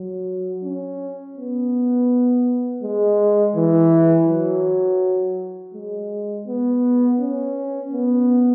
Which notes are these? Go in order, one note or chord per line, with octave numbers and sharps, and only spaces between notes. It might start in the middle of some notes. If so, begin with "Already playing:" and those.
Already playing: F#3
C#4
B3
G#3
E3
F#3
G#3
B3
C#4
B3